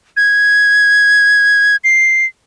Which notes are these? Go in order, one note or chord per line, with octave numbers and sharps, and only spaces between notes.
G#6
C7